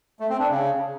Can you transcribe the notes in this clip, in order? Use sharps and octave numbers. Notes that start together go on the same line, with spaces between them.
A3
C4
D4
C#3